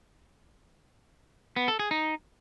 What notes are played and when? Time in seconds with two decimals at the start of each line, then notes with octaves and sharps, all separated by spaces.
1.56 B3
1.68 A4
1.79 G#4
1.91 D#4